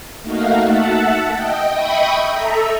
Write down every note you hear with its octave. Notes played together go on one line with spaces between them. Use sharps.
A3 A#3 D#4 F#4 F5
E5 F#5 A5
D#5 G5
D#5 E5 G5 B5 C#6 D#6
A4 E5 A#5